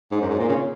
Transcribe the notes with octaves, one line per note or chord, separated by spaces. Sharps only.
G#2
F#2
G#2
A#2
C#3